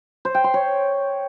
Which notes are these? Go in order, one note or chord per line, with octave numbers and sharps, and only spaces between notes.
C5
G5
C6
C#5